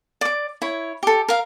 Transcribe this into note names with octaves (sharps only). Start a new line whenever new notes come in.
D5 D6
E4 C#5
G4 A4
A#4 F5